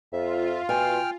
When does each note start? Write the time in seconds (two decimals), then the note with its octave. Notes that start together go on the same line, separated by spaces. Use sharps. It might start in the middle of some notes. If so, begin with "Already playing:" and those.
0.13 F2 F4 E5
0.69 B2 G5 G#5 F6